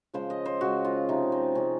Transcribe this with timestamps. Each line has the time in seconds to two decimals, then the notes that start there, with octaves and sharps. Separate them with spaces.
0.14 C#3 F3 G#3 C5
0.30 D#5
0.46 C5
0.61 C#3 F3 G#3 F#4
0.85 F4
1.09 C3 F3 G#3 D#4
1.32 C4
1.55 C3 F3 G#3 C#4